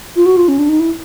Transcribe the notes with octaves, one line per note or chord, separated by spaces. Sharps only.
F4
F#4
F4
C#4
D4
D#4
E4